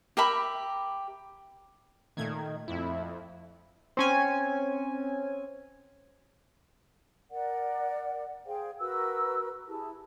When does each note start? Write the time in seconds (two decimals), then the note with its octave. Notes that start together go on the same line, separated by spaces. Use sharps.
0.17 G4 A#4 E5 B5
2.17 A#2 D#3 A3 G#6
2.68 F2 E4
3.97 C4 C#4 G#5
7.30 A#4 D5 F#5
8.46 G#4 C5 F5 G5
8.79 F#4 A#4 B4 E6
9.68 E4 G4 G#4 A5